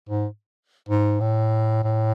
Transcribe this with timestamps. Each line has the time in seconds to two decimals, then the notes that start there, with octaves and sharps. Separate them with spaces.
0.09 G#2
0.88 G#2
1.20 A2
1.84 A2